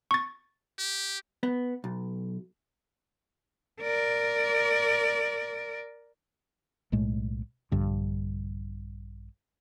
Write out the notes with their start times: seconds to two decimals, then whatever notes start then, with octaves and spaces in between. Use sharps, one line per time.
0.11 C#6 A6
0.78 G4
1.43 B3
1.84 B1
3.81 A#4 D5
6.92 B1 A2 G#3 A3
7.72 A#1 G2 D3